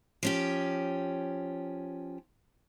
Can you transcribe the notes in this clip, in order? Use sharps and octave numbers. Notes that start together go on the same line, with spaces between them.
F3 C#4 G4